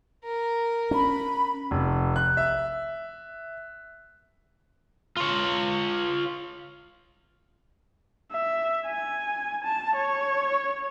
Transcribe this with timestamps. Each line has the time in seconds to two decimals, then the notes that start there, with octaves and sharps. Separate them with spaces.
0.24 A#4
0.91 C#4 B5
1.71 F1
2.16 F#6
2.37 E5
5.17 F4 C#5
8.32 E5
8.86 G#5
9.64 A5
9.96 C#5